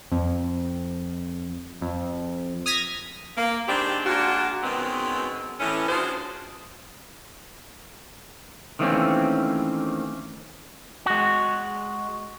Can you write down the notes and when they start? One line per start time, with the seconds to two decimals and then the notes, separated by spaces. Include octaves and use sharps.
0.12 F2
1.81 F2
2.66 D#6 F6 G#6 A#6 B6
3.37 A#3
3.68 D#3 G3 G#3 C4 D4 G4
4.06 G#3 A#3 D4 F4 F#4
4.63 F#2 B2 D#3 G#3 B3 C4
5.60 A2 E3 C#4
5.89 D4 F4 F#4 G#4 C5
8.79 D#3 E3 A3 A#3 C4 C#4
11.06 G#3 F#4